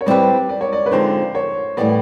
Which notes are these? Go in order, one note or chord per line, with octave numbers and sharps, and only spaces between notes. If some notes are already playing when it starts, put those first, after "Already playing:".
C#5
G3 C4 E4 G4 B4 D5
D5
C#5
D5
B4
D3 F3 G#3 C4 D#4 C5
C#5
A2 E3 G3 B3 D5